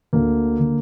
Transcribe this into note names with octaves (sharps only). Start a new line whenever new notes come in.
D2 D3 A#3
D3